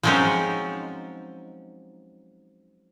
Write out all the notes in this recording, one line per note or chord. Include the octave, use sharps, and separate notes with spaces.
F3 F#3 G#3 C4 C#4 D#4